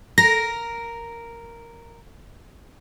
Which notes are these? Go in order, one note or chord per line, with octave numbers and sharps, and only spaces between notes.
A#4 A#6